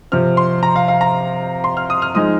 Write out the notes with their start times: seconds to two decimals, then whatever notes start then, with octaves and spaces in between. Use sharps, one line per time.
0.12 C3 F3 C4 F6
0.37 C6
0.63 A#5
0.76 F5
0.88 F5
1.01 A#5
1.64 C6
1.77 F6
1.90 D#6
2.02 F6
2.15 F3 G#3 D#4 D#6